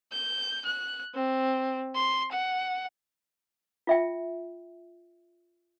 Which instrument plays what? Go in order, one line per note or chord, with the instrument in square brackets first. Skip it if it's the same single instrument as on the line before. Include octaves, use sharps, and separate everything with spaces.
[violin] G6
F#6
C4
C6
F#5
[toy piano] F4 E5 G5